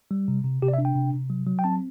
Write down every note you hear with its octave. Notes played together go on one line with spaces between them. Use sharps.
G3
C3
C3
C3 G4
D5
E5
D4
G5
C3
C3
F#3
F#3
G5
C4 A5